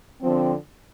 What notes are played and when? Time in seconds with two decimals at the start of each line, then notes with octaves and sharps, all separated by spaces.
0.21 D3 F3 C4